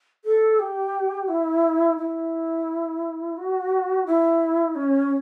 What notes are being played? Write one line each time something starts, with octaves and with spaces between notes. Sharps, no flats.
A4
G4
E4
E4
F#4
E4
C#4